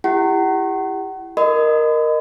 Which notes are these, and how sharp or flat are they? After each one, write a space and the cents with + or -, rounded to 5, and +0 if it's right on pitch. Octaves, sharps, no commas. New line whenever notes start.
E4 +25 G4 +25 F#5 +35
A#4 +0 D#5 -20 B5 +45